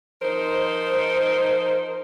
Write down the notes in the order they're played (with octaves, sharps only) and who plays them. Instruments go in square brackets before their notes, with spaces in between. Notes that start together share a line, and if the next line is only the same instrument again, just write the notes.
[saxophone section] F3 D#4 A#4 C5